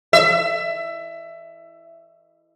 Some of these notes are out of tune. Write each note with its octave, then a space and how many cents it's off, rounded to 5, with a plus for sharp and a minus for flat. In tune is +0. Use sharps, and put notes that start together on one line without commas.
E5 +20